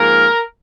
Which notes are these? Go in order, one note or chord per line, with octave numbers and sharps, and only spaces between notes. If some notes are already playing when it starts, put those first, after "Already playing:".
Already playing: G#2 F3 A#3 A#4